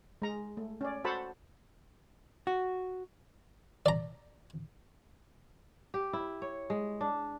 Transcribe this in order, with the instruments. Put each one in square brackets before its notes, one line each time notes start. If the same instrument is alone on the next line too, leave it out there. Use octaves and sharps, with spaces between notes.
[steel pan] G#3 A#5
A3
C#4 D5
F#4 A4 C5 F#5 A5 B5
[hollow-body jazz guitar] F#4
[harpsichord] D5 A#5
[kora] G4
E4
C#5
G#3
D4